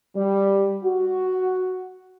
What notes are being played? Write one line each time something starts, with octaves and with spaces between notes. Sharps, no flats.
G3
F#4